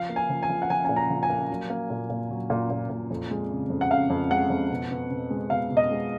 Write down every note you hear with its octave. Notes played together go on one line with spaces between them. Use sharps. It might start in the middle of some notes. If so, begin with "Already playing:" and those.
Already playing: F3 F5
A#3
G#5
F3
G#5
F3
F#5
F3 G#5
A#2 G#5
A#5
F3
G#5
A#3
F#3
A#3
A#2
A#2
F#3
A#2
A#2
A#2
F2
G#3
C#3
F2
F#5
C#3 F5
F2
G#3 F#5
F2
B2
B2
B2
G#3
B2 F5
B2
D#5
G#3